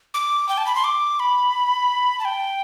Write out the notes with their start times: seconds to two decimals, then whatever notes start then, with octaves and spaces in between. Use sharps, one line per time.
0.14 D6
0.49 G5
0.58 A5
0.66 B5
0.75 C6
0.84 D6
1.19 B5
2.19 A5
2.25 G5